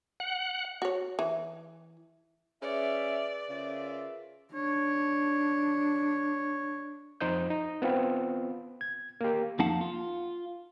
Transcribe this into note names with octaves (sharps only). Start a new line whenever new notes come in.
F#5
F#4 C#5
E3
C#4 G#4 B4 D5 E5
C#3 F4 A#4 E5
D4 C#5
F2 D#4 C5 D#5 G6
D#4
B3 C4 F4
G#6
A#3 G4
F2 A#3 D#4 F5 F#5 A5
F4